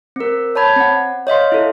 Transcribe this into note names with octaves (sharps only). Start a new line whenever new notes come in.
C4 A#4
C#5 A5 B5 G#6
C4 F#5
C#5 D#5 F5 C6
E4 A4